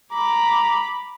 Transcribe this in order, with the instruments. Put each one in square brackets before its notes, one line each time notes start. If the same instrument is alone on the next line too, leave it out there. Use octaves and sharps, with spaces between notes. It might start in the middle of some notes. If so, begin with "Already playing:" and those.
[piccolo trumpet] A#5 [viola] B5 D6